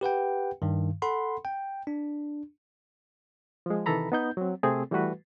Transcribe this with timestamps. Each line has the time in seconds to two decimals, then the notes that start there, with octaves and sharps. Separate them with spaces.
0.01 G4 B4 F#5 G5
0.62 G2 D#3
1.02 A4 F#5 B5 C6
1.45 G5
1.87 D4
3.66 F3 G#3
3.86 C3 D#3 E3 A4 A#5 B5
4.12 B3 D#4 G6
4.37 F#3 C4
4.63 C3 A3 C4 G#4
4.91 E3 G3 A3 F#4 B4